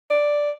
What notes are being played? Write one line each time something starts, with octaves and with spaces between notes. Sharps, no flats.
D5